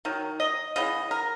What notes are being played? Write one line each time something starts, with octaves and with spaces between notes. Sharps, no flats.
D#3 F#3
D#5
C#3 E3 B3 D#5
A#4